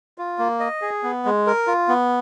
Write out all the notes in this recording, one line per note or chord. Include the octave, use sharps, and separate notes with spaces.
F4
A#3
D#5
G#4
B3
G#3
A#4
F4
B3